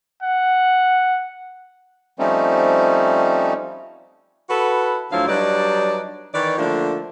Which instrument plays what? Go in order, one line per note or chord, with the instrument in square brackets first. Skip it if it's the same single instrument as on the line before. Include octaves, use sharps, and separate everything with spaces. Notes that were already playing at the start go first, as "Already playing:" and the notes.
[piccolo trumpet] F#5
[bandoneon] F3 G3 A3 C4 C#4 D#4
[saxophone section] E4 F#4 A4 B4
D2 D3 F3 F#3 E4 F5
F#3 G3 D4 D#4 B4 D5
D#3 E3 C#5 D5
D3 F3 A3 A#3 D4